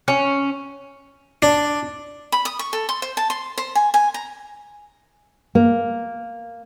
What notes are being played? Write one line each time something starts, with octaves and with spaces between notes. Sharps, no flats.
C#4
D4
B5
D#6
C#6
A4
C6
C5
A5
C6
C5
G#5
G#5
A#5
A#3